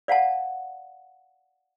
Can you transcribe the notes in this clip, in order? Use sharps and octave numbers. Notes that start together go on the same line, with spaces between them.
D5 F5 F#5 A5